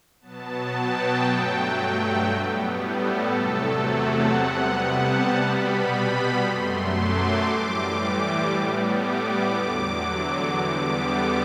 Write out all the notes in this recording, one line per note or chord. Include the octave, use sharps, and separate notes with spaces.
B2 F#3 B3 A5
G5
G2 F#3 A3
A2 G3 B3
A4
E2 C3 F#3 A3
F#5
C3 G3 B3
A5
B2 G3 B3 B5
F#2 F#3 A3 C6
D6
A2 E3 G3
A2 G3 B3
D6
E2 D3 F#3
E2 D3 G3 B3 D6